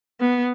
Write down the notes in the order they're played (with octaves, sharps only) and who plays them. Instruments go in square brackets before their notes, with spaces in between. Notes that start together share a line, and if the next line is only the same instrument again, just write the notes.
[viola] B3